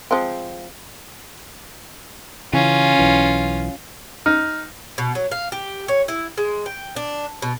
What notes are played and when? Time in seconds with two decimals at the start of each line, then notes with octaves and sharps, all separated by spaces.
0.11 F3 G#3 C4
2.53 C#3 E3 C#4 F4
2.99 B1 E3
4.26 D#4 F6
4.98 B2
5.15 F#3
5.32 F5
5.52 G4
5.88 C#5
6.08 E4
6.38 G#3
6.66 G5
6.96 D4
7.42 B2